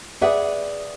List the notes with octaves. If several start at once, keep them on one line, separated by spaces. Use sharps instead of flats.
G#4 B4 D5 E5 F#5